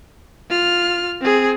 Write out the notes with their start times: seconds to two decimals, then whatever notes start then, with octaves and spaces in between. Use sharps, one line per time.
0.50 F4 F6
1.21 C4 G#4